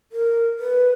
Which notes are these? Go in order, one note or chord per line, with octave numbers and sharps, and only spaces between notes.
A#4
B4